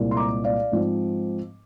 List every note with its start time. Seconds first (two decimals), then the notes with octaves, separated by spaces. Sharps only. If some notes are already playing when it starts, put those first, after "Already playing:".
Already playing: C2 A#2 G#3 C4
0.11 C6
0.17 A#5 D6
0.44 D5 F5
0.72 G#2 F3 C4